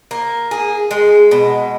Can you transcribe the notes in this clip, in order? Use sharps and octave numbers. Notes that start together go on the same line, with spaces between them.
A#3
G#4
G#3
B2